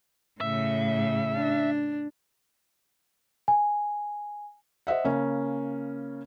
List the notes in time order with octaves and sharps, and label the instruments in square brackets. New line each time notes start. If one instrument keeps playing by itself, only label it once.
[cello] A2 C#3 [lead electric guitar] E5
[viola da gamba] D4
[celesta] G#5
[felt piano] C5 D#5 E5 F#5
C#3 A#3 C#4